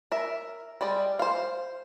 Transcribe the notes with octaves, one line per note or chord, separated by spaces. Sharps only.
A#4 E5
G3 G#3 D5
C5 F5